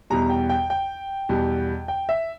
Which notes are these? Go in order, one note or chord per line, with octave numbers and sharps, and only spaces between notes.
E2 B2 G3 A#5
G5
G5
G5
E2 B2 G3
G5
E5